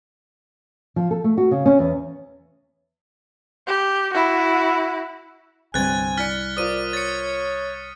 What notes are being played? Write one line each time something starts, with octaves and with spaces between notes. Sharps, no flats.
F3
A4
A3
F#4
C#3
C#4
E2
G4
E4 F#4
G1 C2 G3 C4 G#5 F#6 G#6 A6
E4 D5 F6 A6 B6 C#7
F4 A#4 C5 D5 D#6 D#7
C#5 A6 C#7